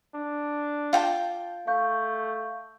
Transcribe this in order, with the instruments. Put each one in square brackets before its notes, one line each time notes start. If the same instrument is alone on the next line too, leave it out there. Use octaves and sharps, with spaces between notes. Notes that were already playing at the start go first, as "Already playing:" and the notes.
[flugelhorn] D4
[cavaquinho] F4 G5 A5
[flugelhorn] A3 [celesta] F5 C#6 G6